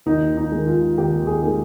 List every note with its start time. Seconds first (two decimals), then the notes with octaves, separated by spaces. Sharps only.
0.06 D#2 D#4
0.37 D#4
0.52 D#3 G#3
0.67 F4
0.98 D#2 G4
1.27 G#4
1.42 D#3 G#3